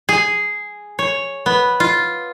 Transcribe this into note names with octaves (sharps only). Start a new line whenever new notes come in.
G#4
C#5
B3
F4